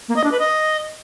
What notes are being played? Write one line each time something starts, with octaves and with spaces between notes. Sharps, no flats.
A#3
D#5
D4
B4
D#5